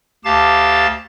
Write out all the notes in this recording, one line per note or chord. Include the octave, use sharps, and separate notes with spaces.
D2 G4 F5 A5 A6